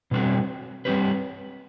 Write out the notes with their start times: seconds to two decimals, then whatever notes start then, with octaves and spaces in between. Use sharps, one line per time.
0.11 B2 G3 C4 F#4
0.85 G3 C4 G4 B4